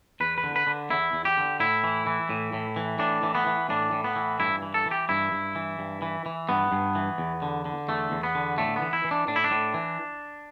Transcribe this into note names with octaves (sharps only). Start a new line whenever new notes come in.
E2 B4
B4
D3
B4
D3
E2 E4
E2
G4
D3
A2 E4
E3
E3
A2
A2
E3
A2 D4
E3
B3
E3
A2 D4
A2
B3
E3
G2 E4
E3
A4
E3
G4
G2 E4
G2
E3
G2
E3
E3
G2 B3
G2
E3
E2
D3
D3
E2 A3
E2
B3
D3
A2 A3
B3
E3
E4
E3
D4
A2 D4
E4
D4
A2
E3